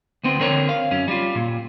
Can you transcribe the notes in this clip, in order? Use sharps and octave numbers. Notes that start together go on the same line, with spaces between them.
D2 B3 C4
D3 C4 A#4 C#5
F5
F#2 C#4
G3 F4
A#2